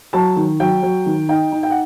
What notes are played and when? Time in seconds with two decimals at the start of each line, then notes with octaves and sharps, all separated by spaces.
0.13 F#3 A5
0.36 D#3
0.60 F#3 G5
0.83 F#3
1.06 D#3
1.29 D#4 G5
1.52 D#4
1.63 G5
1.70 F#5